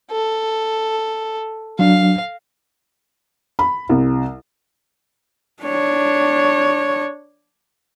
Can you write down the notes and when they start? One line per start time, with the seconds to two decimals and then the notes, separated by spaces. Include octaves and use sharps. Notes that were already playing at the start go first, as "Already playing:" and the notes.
0.11 A4
1.79 F#3 D4 F5
3.59 B5
3.89 C2
5.63 D4 C#5